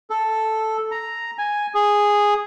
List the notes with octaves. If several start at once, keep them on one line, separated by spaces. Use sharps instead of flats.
A4
A#5
G#5
G#4